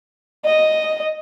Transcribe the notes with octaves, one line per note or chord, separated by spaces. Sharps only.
D#5